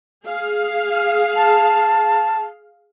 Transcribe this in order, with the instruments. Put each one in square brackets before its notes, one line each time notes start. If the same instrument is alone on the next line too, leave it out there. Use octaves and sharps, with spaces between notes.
[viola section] G#4 F5
[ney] A5